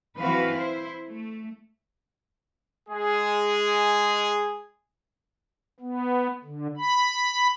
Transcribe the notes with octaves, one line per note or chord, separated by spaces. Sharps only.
E3 C4 F#4 B4 F5
E4 C5
A3
G#3 G#4
B3
D3
B5